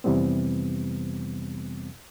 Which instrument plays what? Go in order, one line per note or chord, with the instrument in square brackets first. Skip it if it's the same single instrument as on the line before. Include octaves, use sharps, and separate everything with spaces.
[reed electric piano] F2 C3 E3 G3 B3 C4